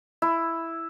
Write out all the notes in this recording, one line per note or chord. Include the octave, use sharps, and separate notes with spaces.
E4